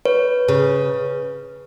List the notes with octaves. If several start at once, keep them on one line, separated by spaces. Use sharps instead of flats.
B4 C#5
C#3